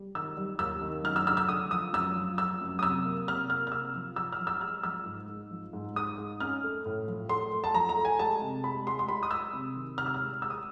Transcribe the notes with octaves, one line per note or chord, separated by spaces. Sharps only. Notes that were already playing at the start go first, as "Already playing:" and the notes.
Already playing: G3
D#3 E6
G3
D#2 E6
D#3
F#2 F6
E6
D3 E6
E6
D3 D#6
F3 D#6
F#2 E6
F3
F3 E6
F#2
D#6
C3 E6
A#3
C3 F6
A#3 F6
F6
C3 E6
F3
F3 E6
F6
F3
E6
G#3 F6
F3 E6
G#2
G#2
F3
G#2
G#2 D#6
G#2
C#4 F6
A3
A2
F3
A3 C6
A3
A5
F3 A#5
A#5
A3
G#5
G#3 A5
C3
G#3 B5
G#3 C6
C6
G#3 B5
D#6
G#3 E6
C3
D#3
C3 F6
E6
F6
G#3
G#3 E6
D#6